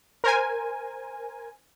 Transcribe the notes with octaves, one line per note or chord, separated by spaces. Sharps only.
A#4 C5 G#5